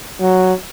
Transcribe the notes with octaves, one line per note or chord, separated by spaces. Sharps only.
F#3